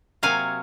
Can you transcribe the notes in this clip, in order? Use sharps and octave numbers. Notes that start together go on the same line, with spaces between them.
C3 F#3 A#3 F5 G#5